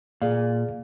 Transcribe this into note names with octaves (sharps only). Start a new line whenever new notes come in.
A#2 G#4 D5 F5